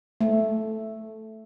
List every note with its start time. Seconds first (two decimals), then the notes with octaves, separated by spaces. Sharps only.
0.21 A3